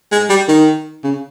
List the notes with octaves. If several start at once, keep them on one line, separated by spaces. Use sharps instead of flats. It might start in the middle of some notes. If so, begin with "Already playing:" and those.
G#3
G3
D#3
C#3